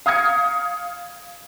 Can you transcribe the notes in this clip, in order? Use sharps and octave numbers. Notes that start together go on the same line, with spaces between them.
F5 D#6 F6 G#6 C#7